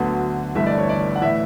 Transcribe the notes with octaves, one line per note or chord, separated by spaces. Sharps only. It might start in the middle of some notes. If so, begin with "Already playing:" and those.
Already playing: D2 D3 F#3 B3
G1 G2 E3 A3 E5
D5
C#5
D5
F#5
A2 E3 E5